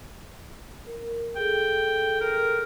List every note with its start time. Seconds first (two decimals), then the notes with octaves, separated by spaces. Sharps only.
0.86 A#4
1.36 G#4 A4 G5
2.21 A#4